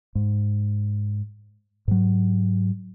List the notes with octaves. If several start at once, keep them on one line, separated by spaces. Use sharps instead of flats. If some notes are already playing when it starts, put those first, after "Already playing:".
G#2
G#2 F#3